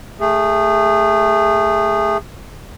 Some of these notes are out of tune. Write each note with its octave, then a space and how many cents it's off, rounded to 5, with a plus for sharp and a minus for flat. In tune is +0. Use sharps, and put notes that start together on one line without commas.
A3 +5 G#4 -25